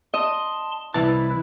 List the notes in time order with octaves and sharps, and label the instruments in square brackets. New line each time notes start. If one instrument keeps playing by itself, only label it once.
[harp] D#5 [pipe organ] A5 C6
[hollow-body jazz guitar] C2 E3 A5 [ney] E4 [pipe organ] B4